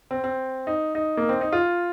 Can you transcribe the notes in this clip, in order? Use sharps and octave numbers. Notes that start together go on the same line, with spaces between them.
C4
C4
D#4
D#4
A#3
C4
D#4
F4